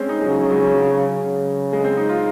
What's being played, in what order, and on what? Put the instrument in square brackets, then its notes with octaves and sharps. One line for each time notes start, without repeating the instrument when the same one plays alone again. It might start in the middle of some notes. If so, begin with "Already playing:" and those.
Already playing: [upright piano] G#3 C4 C#4
D#4
G#3
[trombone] C#3 [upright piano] F#3
[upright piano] F#3
F#3
[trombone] C#3
[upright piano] G#3
C4
D#4
F4